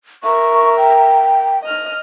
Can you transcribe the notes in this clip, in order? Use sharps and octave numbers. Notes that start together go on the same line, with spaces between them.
A#4 E5 C#6
G5
D#5 F6